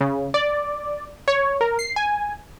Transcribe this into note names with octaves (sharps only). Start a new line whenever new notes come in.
C#3
D5
C#5
A#4
C7
G#5